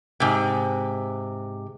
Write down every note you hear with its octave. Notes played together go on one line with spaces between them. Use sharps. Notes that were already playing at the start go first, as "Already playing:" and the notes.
G#2 C3